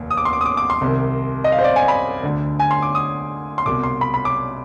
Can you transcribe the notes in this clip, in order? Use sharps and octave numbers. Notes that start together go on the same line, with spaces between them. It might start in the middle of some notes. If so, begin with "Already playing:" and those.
Already playing: F1 D#2 D#3
D#6
D6
C6
D6
D#6
D6
D6
C6
C2 C3 D#3
D#5
F5
C5
D5
G#5
B5
D2 D3
G#5
C6
D6
D#6
C6
C2 B2 D6
C6
B5
B5
D6